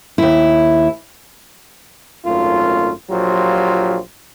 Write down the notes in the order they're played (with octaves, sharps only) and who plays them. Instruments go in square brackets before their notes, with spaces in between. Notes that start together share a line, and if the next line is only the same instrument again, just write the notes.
[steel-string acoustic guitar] D#2 E4
[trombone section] G#1 F#2 A3 F4
A#1 F#3 F4 G4 C5